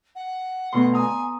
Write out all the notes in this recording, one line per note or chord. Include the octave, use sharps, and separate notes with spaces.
F#5
D2 B2 C6
G#5 A#5 D#6